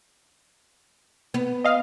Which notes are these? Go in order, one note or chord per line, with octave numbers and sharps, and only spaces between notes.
B3
D#5 F5